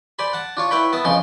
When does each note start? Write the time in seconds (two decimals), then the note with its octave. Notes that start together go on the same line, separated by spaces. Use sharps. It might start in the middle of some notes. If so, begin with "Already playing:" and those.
0.19 C5 D5 G#5 B5
0.33 F#5 A5
0.57 D4 F4 C#5
0.71 E4 B4 C#5 E5 G5 B5
0.93 B3 E5 A5 D#6
1.05 F2 C#3 F3 G#3 C6